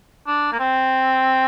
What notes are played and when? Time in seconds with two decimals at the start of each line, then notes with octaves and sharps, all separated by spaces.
0.27 D4
0.53 A#3
0.59 C4